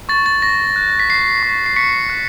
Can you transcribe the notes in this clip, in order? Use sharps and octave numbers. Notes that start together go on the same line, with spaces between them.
C#6 A6
A6
C#6 A#6
F#6
B6
F#6 C7
C#6
C7
C#6 B6 C#7
F#6